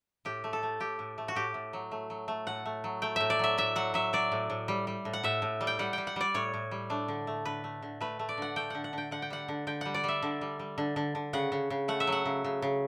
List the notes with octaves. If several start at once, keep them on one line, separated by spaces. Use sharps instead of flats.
A2 G4
A3
A4
A3
A2 G4
A2
A3
F#4
A2 G4
A2
F#3
A3
F#3
A3
A2 F#5
A3
F#3
A3 G5
A2 E5
D5
F#3 E5
A2 E5
F#3 F#5
F#3 E5
F#3 D5
A2
A2
G3
G3
A2
F#5
A2 E5
A2
G3
G5
G3 F#5
G3 G5
F#5
G3 D5
A2 C#5
A2
G3
A3 D4
D3
A3
D3 B4
A3
D3
A3 B4
A3
D5
D3 F#5
A3 G5
D3 F#5
F#5
D3 G5
D3 F#5
G5
G3 F#5
D3
D3 G5
G3 F#5
D5
G3 E5
D3
G3
G3
D3
D3
D3
C#3 F#5
C#3
C#3
A3 F#5
E5
F#3
F#5
C#3
C#3
C#3